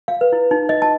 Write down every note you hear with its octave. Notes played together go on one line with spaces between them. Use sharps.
F5
B4
E4
D#4
D#5
A5